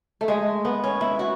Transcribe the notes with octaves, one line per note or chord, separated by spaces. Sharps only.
A3
G#3
B3
C#4
E4
F#4